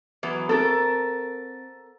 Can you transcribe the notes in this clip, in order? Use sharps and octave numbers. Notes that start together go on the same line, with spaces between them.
E3 F#3 B3
C4 A4 A#4 A6